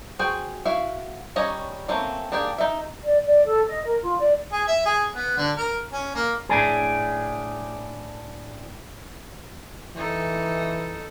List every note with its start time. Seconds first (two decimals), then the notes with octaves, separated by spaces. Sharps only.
0.19 F#4 G#4 C5 G5
0.65 E4 F#4 F5
1.36 G3 C#4 C#5 D#5 A#5
1.88 A3 A#3 C4 C#4
2.32 A#3 D4 G4 G#4
2.58 D#4 E5
3.04 D5
3.25 D5
3.44 A4
3.67 D#5
3.84 A#4
4.02 F4
4.18 D5
4.52 G#4
4.68 E5
4.85 G#4
5.12 B3
5.37 D3
5.56 A#4
5.92 C#4
6.15 A#3
6.49 A2 D4 G#4
9.96 E3 D#4 A4